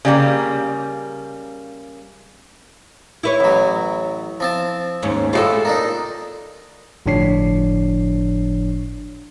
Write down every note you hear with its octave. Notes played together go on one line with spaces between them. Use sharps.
C#3 G3 A#3
E4 B4 C#5
A1 F#3
F3 C4 A5
D#2 G#2 C#4
A2 G#3 F4 F#4 A4
A#3 D4 D#4
G1 A2 F3 D4 C#5 C7